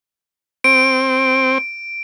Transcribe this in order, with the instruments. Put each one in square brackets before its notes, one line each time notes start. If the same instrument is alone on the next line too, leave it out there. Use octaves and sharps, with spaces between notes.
[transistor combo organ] C4 [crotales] D7